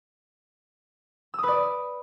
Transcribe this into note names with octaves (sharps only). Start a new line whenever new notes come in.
B4 D5 D#6 E6